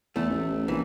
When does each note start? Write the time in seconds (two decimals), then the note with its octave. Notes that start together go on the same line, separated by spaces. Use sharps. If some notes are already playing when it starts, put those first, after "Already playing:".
0.16 E2 A3
0.30 A1
0.68 A#1 E3